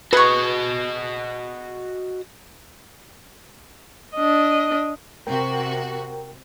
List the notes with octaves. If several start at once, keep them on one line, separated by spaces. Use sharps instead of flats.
F#4 G#4 B4 D#5 C#6
D4 D#5
C3 F#4 A#4 G5